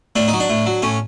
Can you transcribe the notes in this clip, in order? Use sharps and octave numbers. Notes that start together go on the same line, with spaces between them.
A2 D4
D#4
F#3
D4
A2
F#3
A2 C#4